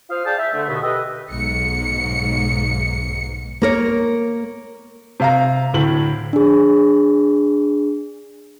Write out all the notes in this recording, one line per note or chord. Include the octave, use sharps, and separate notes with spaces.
F4 C5 F5 D#6 F6
G#4 D5 F5 G5 A5
E5
D3 A3
D#2 B2 D3 B3 D#5 E5
G4 A4 B4 D#5
B1 G#2 C#7
A#3 A#4 C#5
C3 F5 A#5
D2 A2 F#7
D4 G#4